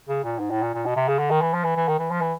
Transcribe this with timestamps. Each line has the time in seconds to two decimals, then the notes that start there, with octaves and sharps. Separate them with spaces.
0.09 C#3
0.24 A#2
0.39 G#2
0.50 A2
0.62 A#2
0.74 A#2
0.85 B2
0.96 C3
1.08 C#3
1.19 D3
1.31 D#3
1.41 E3
1.53 F3
1.64 E3
1.76 E3
1.88 D#3
1.99 E3
2.11 F3
2.21 E3